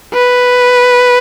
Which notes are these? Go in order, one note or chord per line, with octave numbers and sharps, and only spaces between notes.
B4